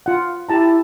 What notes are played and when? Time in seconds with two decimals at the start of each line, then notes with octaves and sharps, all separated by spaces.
0.06 F4 F#5
0.49 E4 G4 A5 A#5